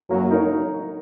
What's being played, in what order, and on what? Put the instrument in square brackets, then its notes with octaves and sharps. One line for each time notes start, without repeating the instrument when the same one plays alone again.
[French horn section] F#2 F#3 [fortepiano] A#3
[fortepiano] D#4 A#4 C#5